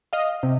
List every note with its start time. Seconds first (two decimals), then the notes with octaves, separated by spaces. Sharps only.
0.13 D#5 F5
0.43 C3